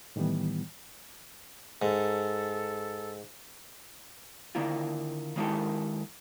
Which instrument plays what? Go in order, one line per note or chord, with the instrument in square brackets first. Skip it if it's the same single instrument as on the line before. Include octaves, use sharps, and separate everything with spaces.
[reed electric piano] A2 D#3 E3 G3 B3
[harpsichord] G#2 [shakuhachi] A4
[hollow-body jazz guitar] D3 D#3 A#3 E4 F4
D#3 G#3 A#3 E4 G4 A4